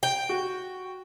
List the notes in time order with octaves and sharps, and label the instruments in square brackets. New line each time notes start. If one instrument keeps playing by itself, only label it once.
[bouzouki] G5
[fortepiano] F#4